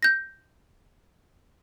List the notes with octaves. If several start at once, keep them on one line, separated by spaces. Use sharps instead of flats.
G6 A#6